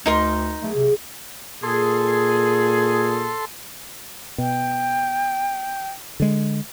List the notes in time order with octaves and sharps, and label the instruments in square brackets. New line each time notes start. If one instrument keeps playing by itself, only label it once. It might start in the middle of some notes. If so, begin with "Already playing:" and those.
[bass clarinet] D2 [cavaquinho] D#4 A#4 C6
[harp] B1 F#3 G#4 [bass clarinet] A3
[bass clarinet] C3
[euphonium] A#2 [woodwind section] G#4 [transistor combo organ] A4 C6
[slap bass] B2 [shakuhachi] G5
[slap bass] D3 G#3